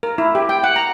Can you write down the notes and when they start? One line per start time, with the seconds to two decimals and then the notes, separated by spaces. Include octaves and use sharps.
0.03 A#4
0.18 E4
0.35 G4
0.49 G5
0.64 F#5
0.76 A#5